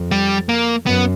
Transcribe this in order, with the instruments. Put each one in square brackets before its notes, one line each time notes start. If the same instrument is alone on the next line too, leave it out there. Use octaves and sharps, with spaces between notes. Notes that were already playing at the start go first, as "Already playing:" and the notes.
Already playing: [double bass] F2
[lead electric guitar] G3
A#3
[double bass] F#2 [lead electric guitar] B3